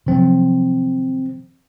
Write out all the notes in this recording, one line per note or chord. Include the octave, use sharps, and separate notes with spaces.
C3 D#3 F3 F#3 C4